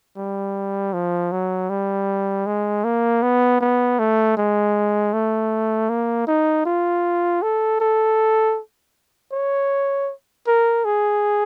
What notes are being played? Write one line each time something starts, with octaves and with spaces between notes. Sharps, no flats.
G3
F3
F#3
G3
G#3
A#3
B3
B3
A3
G#3
A3
A#3
D#4
F4
A4
A4
C#5
A#4
G#4